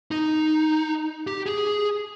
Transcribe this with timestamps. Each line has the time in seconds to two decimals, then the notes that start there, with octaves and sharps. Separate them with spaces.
0.11 D#4
1.27 G4
1.46 G#4